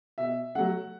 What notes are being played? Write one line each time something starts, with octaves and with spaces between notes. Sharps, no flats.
B2 E5
F#3 A3 F#5